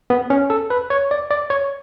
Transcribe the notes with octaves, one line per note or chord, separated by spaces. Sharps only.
B3
C#4
A4
B4
C#5
D5
D5
C#5